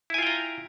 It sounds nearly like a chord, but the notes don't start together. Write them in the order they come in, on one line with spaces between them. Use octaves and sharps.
E4 G#5 F4 G5 A#5